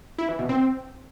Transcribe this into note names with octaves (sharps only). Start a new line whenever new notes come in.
E4
E3
B2
C4